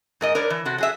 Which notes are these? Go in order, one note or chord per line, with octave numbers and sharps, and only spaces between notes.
G#2 A#4 D#5
D4 A#4 B4 C#5 D5
E3
C3 F#4 A4
F#3 G#4 E5